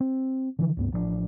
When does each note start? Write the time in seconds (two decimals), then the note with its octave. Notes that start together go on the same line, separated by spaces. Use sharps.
0.01 C4
0.59 D3 E3 F3
0.77 C#2 G2 B3
0.92 A1 F3 A3 D4